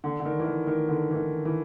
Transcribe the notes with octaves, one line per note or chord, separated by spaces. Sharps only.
D3
D3
D#3
E3
D#3
D#3
D3
E3
D#3
E3